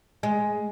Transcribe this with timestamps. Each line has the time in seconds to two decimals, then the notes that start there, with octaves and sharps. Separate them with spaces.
0.23 G#3